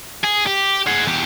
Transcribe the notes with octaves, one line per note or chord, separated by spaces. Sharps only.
G#4
G4
G#4 F#5
E2 G4